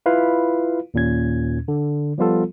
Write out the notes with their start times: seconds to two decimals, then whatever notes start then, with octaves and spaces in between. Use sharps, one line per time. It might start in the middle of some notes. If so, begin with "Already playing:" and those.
0.06 E4 F4 B4 F5
0.94 D#2 A#2 C#4 G#6
1.68 D3
2.18 F3 G3 B3 F4 A4